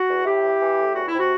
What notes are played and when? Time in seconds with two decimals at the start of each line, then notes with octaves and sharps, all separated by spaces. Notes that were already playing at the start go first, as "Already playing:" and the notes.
Already playing: F#4
0.08 E2
0.25 A2 E4 G4
0.43 E3
0.61 E3
0.78 A2
0.95 E2 F#4
1.07 E4
1.13 C3
1.19 F#4